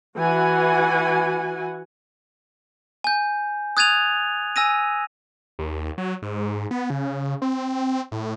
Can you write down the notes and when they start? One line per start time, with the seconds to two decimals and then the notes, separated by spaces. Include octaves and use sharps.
0.17 E3 F#4 F#5 G#5
3.04 G#5 G6
3.77 D#6 F#6 G#6 A6 D#7 F7
4.56 G#5 E6 A#6 D#7
5.59 D#2
5.98 F#3
6.22 G#2
6.71 B3
6.90 C#3
7.42 C4
8.12 A2